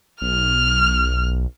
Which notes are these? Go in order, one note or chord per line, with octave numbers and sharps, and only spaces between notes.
B1 F6